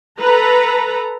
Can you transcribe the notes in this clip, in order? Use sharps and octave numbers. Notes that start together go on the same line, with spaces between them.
A4 B4 A#5